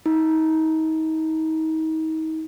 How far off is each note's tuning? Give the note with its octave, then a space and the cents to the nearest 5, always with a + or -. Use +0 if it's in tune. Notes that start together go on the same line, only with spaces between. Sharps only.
D#4 +35